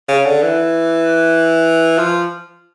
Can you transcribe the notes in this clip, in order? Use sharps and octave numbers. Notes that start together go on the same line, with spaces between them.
C#3
D3
E3
F3